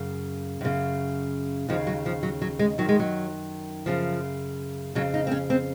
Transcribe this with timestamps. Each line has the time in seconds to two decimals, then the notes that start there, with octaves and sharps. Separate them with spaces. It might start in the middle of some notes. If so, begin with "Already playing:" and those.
Already playing: F#2 C#3
0.61 F#2 C#3
1.68 D#2 C#3 F3
1.87 F#3
2.06 F3
2.23 F#3
2.41 F#3
2.59 G#3
2.78 F#2 D#3 F#3
2.89 G#3
2.99 F#3
3.86 F#2 C#3 F3
4.95 F2 C#3 F#3
5.14 D#4
5.27 C4
5.31 C#4
5.50 C4